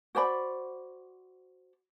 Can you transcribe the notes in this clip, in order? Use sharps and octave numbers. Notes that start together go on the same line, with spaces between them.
F#4 C5 D5 B5